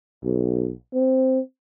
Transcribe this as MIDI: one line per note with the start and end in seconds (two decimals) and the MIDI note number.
0.24 0.72 35
0.94 1.40 60